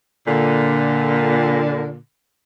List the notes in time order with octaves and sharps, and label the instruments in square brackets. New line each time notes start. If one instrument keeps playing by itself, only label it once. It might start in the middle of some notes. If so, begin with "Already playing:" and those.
[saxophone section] A#2 D3